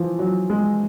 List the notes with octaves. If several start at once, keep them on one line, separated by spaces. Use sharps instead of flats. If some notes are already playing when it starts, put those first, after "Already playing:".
Already playing: E3 F3
F#3
G#3